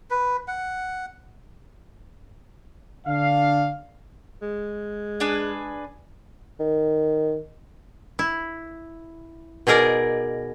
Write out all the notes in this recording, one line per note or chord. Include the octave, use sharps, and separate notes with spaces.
B4
F#5
D3 D4 F5
G#3
D4 G#4 B4
D#3
E4
B2 D#4 G#4 A#4 D5